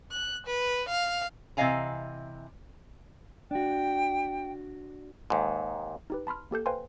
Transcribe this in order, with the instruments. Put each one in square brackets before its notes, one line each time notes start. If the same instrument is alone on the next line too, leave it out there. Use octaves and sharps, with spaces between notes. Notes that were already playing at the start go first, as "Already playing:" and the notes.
[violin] F#6
B4
F5
[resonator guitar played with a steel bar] C3 E3 D#5 F5 G#5 A#5
[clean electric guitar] D4 F#4 [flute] G5
[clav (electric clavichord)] D#2 G#2
[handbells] D#4 G4 B4
A5 B5 C6 F6
A#3 G4 A4 G6
B4 C5 F5 G5 G#5 C6